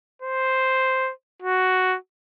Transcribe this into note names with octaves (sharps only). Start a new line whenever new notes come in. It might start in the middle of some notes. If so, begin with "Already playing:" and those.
C5
F#4